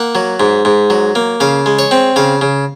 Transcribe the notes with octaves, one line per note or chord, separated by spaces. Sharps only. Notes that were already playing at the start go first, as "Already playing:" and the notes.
Already playing: A#3 F#5
F#3
G#2
G#2
F#3
A#3
C#3 F5
G#3
C#5
C4
C#3 F5
C#3